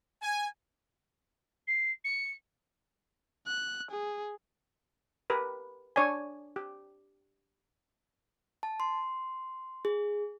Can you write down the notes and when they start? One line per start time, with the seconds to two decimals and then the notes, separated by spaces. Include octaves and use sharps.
0.22 G#5
1.67 C7
2.04 C#7
3.47 F#6
3.91 G#4
5.30 G4 A#4 B4
5.96 D4 C#5 D5 G#5
6.56 G4
8.63 A5
8.80 C6
9.85 G#4